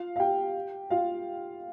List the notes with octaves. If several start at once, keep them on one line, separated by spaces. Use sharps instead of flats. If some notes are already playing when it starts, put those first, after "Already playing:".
Already playing: F4 F5
F5
G4 G5
F4 F5